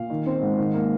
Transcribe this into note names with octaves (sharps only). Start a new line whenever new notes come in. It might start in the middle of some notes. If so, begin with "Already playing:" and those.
Already playing: A#2 F5
D#3
C4
G#2
D#3
A#3